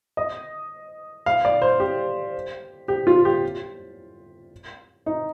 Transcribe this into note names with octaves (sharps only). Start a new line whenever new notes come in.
D#5
F5
D5
C5
G4
G4
F4
G4
D#4